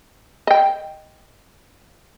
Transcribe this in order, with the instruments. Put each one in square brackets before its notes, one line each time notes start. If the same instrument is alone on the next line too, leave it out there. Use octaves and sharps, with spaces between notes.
[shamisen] D#5 G5